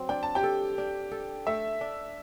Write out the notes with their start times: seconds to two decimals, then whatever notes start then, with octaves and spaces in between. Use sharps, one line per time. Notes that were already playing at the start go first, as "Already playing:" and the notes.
Already playing: F#3 C4
0.09 D4 G5
0.23 A5
0.35 G4 G5
0.43 A4
0.78 D4
1.11 A4
1.47 A3 E5
1.81 D4